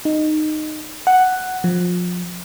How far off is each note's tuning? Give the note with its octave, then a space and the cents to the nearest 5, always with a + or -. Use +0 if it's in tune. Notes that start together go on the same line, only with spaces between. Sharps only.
D#4 -15
F#5 +5
F3 +30